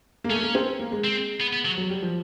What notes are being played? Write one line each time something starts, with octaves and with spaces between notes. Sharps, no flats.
A#3
A3 C#4
A#3
C4
A#3
G#3
C4
B3
B3
F#3
F#3
G3
F3